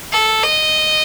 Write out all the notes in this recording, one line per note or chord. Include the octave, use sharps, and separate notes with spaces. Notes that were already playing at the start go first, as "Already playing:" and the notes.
A4
D#5